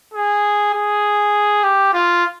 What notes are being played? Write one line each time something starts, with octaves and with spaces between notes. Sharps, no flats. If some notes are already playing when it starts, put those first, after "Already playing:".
G#4
G#4
G4
F4